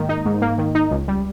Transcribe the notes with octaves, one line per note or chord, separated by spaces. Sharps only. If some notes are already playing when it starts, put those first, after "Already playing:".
Already playing: G#2 D#3 A#3
D#4
G#2
A#3
D#3
D#4
C#2
G3